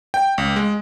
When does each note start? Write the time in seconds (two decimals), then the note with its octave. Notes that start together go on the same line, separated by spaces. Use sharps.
0.14 G5
0.38 C#2
0.56 G#3